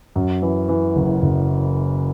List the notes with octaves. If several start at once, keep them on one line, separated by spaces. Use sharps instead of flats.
F#2
E3
E3
F#1
F#1